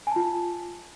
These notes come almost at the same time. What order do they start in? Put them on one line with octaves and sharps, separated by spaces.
G#5 A5 F4